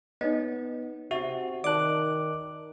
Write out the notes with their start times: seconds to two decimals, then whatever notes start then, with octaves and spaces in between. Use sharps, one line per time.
0.21 B3 D#4 C#5 D#5
1.11 C3 F#4 E5
1.64 D#3 D5 A5 D6 F#6